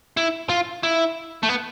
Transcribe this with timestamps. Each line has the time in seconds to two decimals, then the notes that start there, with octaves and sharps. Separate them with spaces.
0.17 E4
0.49 F4
0.83 E4
1.43 A3
1.49 B3